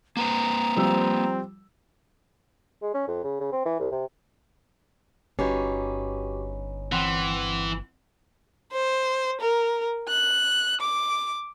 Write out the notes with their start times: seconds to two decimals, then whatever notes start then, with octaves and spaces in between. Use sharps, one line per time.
0.17 A#3 B4 C5 A#5
0.77 F3 G3 C4 E6
2.81 G#3
2.94 C#4
3.07 F2
3.24 C#3
3.40 C#3
3.52 C4
3.65 E3
3.79 C2
3.91 C3
5.39 G1 C#4 D#4 F#4 G4 B4
6.92 E3 C4 F#5 C6
8.73 C5
9.41 A#4
10.09 F#6
10.81 D6